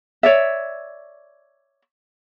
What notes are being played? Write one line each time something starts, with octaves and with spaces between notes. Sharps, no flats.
C#5 D5 E5